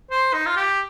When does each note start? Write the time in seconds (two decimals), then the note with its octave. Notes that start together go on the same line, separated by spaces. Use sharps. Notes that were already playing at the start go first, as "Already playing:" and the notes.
0.10 C5
0.33 D#4
0.46 F4
0.56 G4